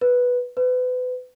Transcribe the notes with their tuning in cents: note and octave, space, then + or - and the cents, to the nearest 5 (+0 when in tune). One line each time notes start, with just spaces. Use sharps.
B4 -5
B4 +30